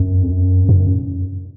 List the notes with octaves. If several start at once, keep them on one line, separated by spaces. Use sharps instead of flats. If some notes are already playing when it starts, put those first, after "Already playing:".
Already playing: F#2
F2
F#2
F#2